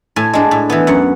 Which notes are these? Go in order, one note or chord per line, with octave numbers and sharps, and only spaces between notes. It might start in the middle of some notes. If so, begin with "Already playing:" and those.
A2 G#5
G#3 D4
A2
E3 B3
F#2 F#5